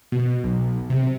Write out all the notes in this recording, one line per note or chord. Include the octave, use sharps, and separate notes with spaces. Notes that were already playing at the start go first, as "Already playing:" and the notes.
B2
B1
C3